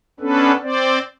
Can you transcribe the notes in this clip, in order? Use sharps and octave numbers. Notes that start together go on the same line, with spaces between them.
B3 C#4 D4 A4 B4
C4 C5 D5